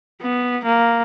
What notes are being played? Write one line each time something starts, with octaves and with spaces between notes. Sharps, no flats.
B3
A#3